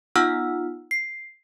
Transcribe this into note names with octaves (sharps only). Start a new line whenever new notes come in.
B3 D#4 F4 F#5 E6 F6
C7